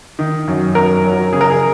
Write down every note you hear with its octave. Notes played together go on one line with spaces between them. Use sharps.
D#3
F#2
F#2 A#4
F#3
C#3 G#4
A#4
G#4